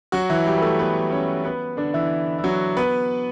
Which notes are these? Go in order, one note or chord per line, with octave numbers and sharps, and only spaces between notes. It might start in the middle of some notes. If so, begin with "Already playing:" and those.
F#3 F#4
E3 E4
G3 G4
B4
A3 A4
B3 B4
C#4 C#5
B3 B4
D3 D4
E3 E4
E4
F#3 F#4
B3 B4